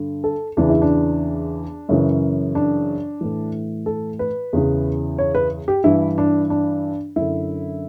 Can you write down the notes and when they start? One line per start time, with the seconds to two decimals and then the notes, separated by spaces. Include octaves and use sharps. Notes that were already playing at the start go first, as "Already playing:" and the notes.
Already playing: G2 D3
0.24 A4
0.57 E2 C#3 E3 D4
0.70 E4
0.82 D4
1.89 F#2 C#3 E3
2.55 D4
3.21 A2 E3
3.86 A4
4.19 B4
4.53 E2 C#3 E3
5.18 C#5
5.35 B4
5.68 G4
5.84 G2 E3 E4
6.18 D4
6.50 D4
7.16 F#2 D3 E4